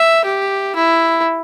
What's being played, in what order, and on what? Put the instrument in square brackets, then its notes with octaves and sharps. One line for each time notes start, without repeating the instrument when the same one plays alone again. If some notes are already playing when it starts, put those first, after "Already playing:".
Already playing: [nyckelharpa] E5
G4
E4